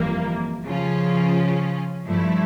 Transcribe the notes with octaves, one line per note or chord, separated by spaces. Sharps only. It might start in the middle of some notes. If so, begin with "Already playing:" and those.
Already playing: G1 F2 E3 A#3
C#3 F3 C#4 F4
G2 F3 A3 E4